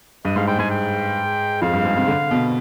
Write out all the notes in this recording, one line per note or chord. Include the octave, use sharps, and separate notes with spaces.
G2 D#5
G#2 F5
G#2 G5
G#2 G#5
G5
F2 F5
G2
G#2
C3
D3
B2